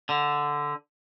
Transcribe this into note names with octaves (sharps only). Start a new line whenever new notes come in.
D3